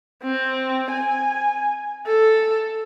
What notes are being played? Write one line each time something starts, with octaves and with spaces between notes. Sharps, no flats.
C4
G#5
A4